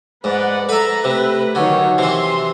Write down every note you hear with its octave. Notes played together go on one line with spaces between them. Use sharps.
G#2 B4 D5 F#5
A4 B4 E5 A#5
C3 A3 B4
D3 D#3 F#3 C#5
C3 E3 C6